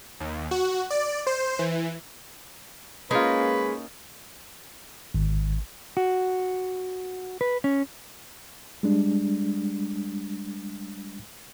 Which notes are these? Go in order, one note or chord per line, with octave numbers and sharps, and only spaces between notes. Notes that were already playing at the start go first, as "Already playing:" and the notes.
D#2
F#4
D5
C5
E3
G#3 A#3 C#4 D#4 F4 B4
G#1
F#4
B4
C#4
G3 G#3 D4